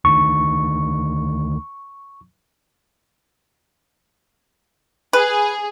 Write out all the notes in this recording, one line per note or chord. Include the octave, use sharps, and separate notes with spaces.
D2 D#3 C#6
G#4 B4